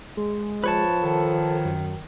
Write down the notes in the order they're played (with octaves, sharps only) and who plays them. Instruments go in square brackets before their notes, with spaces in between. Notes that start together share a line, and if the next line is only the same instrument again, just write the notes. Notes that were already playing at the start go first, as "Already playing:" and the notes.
[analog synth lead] G#3
[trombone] F3 [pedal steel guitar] B4 C#5 A5
[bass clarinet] D#3 [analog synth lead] A4
[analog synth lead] F#2